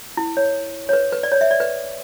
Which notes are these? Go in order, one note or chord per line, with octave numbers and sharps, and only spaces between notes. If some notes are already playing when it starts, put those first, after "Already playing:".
E4
C#5
C#5
B4
B4
D5
C#5
E5
D5
B4